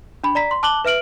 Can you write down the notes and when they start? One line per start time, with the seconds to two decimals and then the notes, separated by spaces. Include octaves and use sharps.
0.24 D4 B5
0.35 D5 A#5 B6
0.51 C6
0.63 A5 D6 F#6 F#7 G7
0.85 B4 E5 F6 D7 F#7